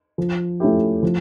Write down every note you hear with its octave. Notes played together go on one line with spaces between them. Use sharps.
F3
A3 C#4 E4 G4
F3